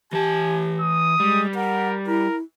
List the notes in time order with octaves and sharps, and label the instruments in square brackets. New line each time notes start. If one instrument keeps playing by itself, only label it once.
[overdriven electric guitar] E3 A5 [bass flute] G4 [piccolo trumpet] G#5
[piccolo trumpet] D#6
[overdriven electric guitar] G3 [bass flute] G#3
[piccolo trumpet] A#4 [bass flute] F#5
[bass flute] E4 [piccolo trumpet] A#4